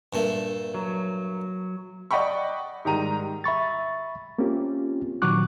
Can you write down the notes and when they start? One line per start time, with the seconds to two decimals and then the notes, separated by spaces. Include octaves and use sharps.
0.13 G2 A#2 A3
0.74 F#3
2.11 D5 D#5 F#5 G5 B5 C#6
2.85 G#2 D#3 G3 A#5 D#7
3.44 E5 B5 C#6 A6
4.38 A#3 C4 C#4 F4 G4
5.22 A#2 D#3 F#3 C#6 D6 F#6